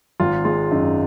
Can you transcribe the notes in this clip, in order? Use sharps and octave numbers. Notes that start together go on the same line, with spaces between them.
G#1 F4
G#3 F4
F#2 D#4